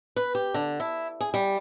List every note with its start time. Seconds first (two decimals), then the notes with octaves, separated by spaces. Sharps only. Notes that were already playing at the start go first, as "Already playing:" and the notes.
0.16 B4
0.35 G4
0.54 D3
0.80 E4
1.21 G#4
1.34 G3